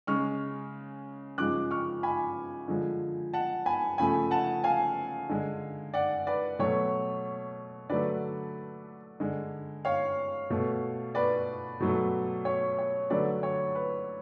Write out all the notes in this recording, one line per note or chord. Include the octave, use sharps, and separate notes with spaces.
C#3 G#3 C#6 F6
C#3 F3 G#3 D6 F#6
C#6 F6
G#5 B5
D3 F3 G#3
F#5 A5
G#5 B5
C#3 F3 A3 G#5 B5
F#5 A5
F5 G#5
D3 G#3
D5 F#5
B4 D5
B2 F#3 A3 C#5
D3 F#3 A3 B4 D5
D3 G#3
C#5 F5
B2 A3
B4 D5
B2 F#3 A3
C#5
C#5
D3 F#3 A3 B4 D5
C#5
B4